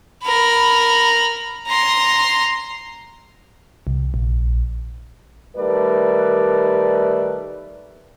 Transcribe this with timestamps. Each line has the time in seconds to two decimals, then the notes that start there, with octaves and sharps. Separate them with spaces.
0.24 A#4 B5
1.68 A#5 C6
3.87 C2
4.14 A#1
5.56 D#3 G3 A3 A#4 B4 D5